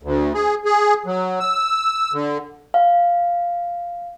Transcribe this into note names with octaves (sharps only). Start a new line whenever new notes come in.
D2
G#4
G#4
F#3
E6
D3
F5